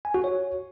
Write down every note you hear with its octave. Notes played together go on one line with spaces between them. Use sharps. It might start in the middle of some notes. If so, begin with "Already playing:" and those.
G#5
F#4
C#5